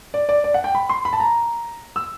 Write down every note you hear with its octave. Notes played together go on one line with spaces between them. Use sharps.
D5
D5
D5
F#5
G5
B5
C6
B5
A5
A#5
E6